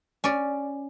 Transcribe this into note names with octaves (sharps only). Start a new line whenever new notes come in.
C#4 D5